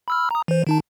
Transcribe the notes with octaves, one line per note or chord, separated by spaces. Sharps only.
B5 E6 F6
A#5 D#6
E3 C5
D#3 D#4 A5